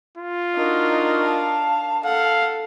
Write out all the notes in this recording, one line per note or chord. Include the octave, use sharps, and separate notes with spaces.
F4
D4 D#4 F#4 A#4
F5 A5
A4 F5 F#5